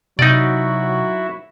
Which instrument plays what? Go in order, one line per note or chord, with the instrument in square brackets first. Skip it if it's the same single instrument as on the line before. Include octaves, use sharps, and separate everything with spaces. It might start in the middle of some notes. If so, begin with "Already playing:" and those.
[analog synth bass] C3 [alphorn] F#3 [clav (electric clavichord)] D#4 D5 [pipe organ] E4 F#4 E5